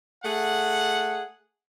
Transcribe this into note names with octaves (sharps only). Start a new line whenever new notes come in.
A3 G#4 F#5